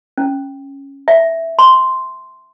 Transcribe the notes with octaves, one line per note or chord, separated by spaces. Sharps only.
C#4
E5
C6